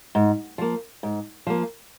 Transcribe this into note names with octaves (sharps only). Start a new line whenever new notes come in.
G#2
F3 A#3
G#2
F3 A#3